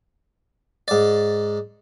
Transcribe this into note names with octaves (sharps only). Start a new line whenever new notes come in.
G#2 D5